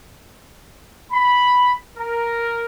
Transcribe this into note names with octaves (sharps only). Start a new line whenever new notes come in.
B5
A#4